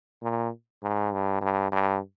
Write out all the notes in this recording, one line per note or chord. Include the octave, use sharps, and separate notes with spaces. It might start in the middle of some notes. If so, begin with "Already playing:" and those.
A#2
G#2
G2
G2
G2